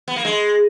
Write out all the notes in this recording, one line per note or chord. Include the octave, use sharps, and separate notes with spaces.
B3
A#3
G#3